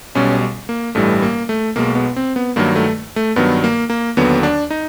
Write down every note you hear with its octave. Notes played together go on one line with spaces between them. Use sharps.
B1 B2 G3 C#4
A#3
A1 G2 E3 G3 A3
A#3
A3
B1 B2 G#3 A#3
B3
C4
B3
G2 D#3 F#3 A#3
A3
A3
G2 D#3 F#3 B3
A#3
A#3
D#2 D3 F#3 B3
D4
D#4